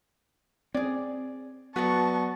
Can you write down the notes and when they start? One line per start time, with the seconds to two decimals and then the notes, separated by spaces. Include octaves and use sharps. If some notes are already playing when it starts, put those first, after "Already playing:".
0.74 C4 G#4 D5 G#6
1.76 F#3 B3 F#4 B4 D5 F#5 A5 C#6